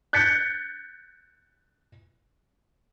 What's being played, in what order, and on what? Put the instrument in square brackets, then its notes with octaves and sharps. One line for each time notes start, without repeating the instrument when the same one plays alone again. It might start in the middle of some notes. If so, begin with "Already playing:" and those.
[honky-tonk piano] F#6 G6 A6 B6 C#7